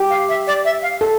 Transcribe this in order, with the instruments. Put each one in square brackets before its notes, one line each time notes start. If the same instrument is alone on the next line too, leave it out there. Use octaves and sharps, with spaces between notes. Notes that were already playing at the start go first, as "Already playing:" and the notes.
Already playing: [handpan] G4
[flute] F5
E5
D5
E5
F5
[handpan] A4